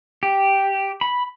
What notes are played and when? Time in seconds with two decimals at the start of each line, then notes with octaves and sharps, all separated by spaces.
0.23 G4
1.01 B5